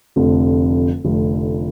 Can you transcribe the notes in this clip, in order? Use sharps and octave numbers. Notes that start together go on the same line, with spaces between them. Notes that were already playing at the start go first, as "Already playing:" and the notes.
F1 F2 D3
F1 F2 D3